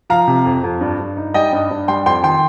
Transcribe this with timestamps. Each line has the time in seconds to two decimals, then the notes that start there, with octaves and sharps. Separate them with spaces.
0.10 F3 F5 A#5
0.28 C3
0.45 F2
0.64 F2
0.81 G2
0.99 G2
1.17 D#4
1.34 G3 D#5 G5
1.53 G2
1.71 G2
1.88 G3 G5 C6
2.06 F2 G5 C6
2.24 D#3 G5 C6